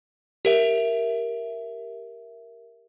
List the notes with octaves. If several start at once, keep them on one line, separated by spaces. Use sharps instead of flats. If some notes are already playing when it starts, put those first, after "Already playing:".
G4 A#4 E5